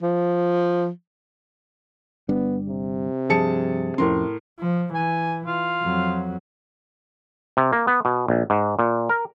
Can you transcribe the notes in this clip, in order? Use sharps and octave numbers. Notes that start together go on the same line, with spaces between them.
F3
G1 G3 B3 D4
C3
G2 F3 G#4 A5 C#7
F2 A2 F3 C#4 A#4 C6
F3
E3 G#5
F4
F2 F#3
C3
A#3
B3
B2
A#1
G#2
A#2
A#4